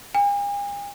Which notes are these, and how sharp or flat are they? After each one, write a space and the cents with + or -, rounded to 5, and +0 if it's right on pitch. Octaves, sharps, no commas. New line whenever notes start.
G#5 -45